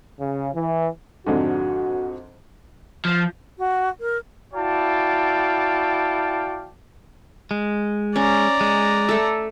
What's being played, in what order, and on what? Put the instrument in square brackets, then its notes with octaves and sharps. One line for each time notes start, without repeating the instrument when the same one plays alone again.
[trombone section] C#3
E3
[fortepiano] F2 G#2 D3 [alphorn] F#4
[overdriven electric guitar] F3
[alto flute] F#4
A#4
[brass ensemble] E4 F#4 D5 F5 G5 A5
[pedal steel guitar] G#3
[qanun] C#4 [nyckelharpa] D5 A#5
[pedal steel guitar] G#3
[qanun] A3 A4